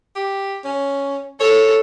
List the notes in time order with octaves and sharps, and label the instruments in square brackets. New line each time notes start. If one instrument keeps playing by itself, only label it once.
[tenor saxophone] G4
C#4
[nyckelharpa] A4 [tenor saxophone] C#5